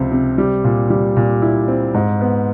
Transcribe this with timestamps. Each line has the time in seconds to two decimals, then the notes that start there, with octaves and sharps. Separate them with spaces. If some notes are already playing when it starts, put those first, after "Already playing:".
Already playing: C#2 C3 F3
0.12 C3
0.38 G3
0.64 A#2
0.90 G3
1.16 A#2
1.42 E4
1.68 C4
1.94 G#2
2.21 B3